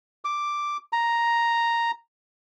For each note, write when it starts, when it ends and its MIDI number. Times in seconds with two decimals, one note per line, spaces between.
0.25 0.77 86
0.93 1.91 82